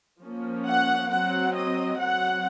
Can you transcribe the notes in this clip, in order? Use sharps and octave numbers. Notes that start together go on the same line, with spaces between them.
F3 A#3 C#4
F#5
F#3 C4 F#5
D#5
F#3 C4 F#5